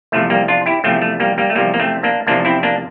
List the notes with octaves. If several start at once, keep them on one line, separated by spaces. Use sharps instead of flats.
E2 C3 F3 A3
G3 A#3
D4 F4
E4 G4
E2 C3 F3 A3 C4
A3
G3 A#3
G3 A#3
A3
E2 C3 F3 G3 A#3
A#3
A3 C4
A#3 D4
E2 C3 F3 A#3 D4
C4 E4
A#3 D4